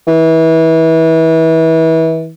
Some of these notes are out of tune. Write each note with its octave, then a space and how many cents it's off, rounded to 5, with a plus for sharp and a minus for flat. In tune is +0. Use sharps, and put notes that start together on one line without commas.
E3 -30